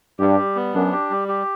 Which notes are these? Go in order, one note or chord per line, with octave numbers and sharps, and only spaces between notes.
G2 G4
G3
B3
F#2 D4
G4
G3
G4